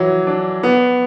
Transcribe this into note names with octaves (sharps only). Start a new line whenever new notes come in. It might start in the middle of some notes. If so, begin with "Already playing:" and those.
Already playing: E3 F#3
D4
B3